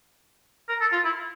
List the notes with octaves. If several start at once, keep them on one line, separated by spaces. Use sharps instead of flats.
A#4
A4
F4
E4